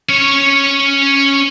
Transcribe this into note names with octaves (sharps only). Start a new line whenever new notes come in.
C#4 C#5